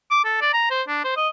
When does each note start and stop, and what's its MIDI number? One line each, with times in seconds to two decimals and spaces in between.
0.11 0.23 86
0.25 0.38 69
0.41 0.52 74
0.54 0.70 82
0.70 0.82 72
0.87 1.01 62
1.04 1.12 72
1.17 1.28 75